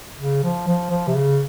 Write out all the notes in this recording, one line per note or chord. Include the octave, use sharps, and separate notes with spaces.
C#3
F3
F3
F3
C3
C#3